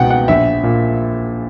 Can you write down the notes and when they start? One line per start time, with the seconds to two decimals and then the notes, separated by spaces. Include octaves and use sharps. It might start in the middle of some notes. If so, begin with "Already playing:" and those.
Already playing: C#2 B2 F#5 G5
0.10 F#5
0.28 A#1 E5
0.63 A#2